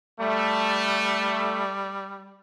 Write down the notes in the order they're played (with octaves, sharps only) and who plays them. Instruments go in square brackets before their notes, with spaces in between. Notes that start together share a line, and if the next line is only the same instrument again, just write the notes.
[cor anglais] G3 [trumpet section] A3